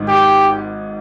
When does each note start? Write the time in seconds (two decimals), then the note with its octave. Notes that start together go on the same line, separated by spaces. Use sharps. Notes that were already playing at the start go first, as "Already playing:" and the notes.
Already playing: G#1 G#2 D#3
0.08 G4